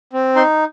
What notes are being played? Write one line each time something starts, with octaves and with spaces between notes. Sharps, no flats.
C4
D#4 C6